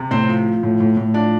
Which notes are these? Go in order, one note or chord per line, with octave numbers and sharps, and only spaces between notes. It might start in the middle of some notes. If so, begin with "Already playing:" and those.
Already playing: C3
A2 C4 C5
F3
F3
A2
A2
A2
F3 D4 D5